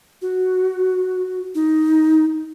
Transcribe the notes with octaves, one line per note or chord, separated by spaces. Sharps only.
F#4
D#4